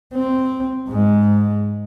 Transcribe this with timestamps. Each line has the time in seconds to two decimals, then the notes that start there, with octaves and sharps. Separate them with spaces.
0.14 C4
0.89 G#2 G#3